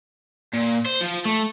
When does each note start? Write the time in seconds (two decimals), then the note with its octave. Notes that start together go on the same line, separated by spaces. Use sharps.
0.54 A#2
0.86 C5
1.01 F3
1.25 A3